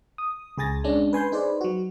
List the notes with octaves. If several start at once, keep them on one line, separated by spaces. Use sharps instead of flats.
D#6
C#2 G#4 G#5 A6 A#6
G#3 C#4 D4
B4 G#5 C6 G6
D#4 G#4 B4 C5 D5
F#3 F#4